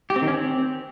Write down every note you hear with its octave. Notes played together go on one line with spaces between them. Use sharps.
G4
C4
D#3
C#4
C4